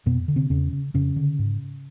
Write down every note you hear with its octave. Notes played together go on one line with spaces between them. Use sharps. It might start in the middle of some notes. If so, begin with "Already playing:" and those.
F2 B2 B3
D3
C3 C4
E2 C#3 C#4
C#3
F2 C#3 C#4
D3
G#2